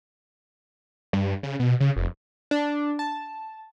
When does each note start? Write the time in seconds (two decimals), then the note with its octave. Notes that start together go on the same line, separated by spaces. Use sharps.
1.13 G2
1.43 C#3
1.60 B2
1.80 C#3
1.96 F1
2.51 D4
2.99 A5